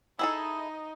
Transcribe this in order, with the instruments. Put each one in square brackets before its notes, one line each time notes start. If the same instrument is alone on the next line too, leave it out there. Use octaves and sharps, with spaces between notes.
[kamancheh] D#4 D#5 [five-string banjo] E4 G#4 A4